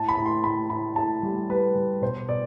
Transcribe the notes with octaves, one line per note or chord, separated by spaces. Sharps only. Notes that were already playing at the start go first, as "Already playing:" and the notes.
Already playing: A2 A5
B5
A2
C6
A2 B5
A2 B5
A2 A5
G3
G3 B4
G3
B2 C5
B2 D5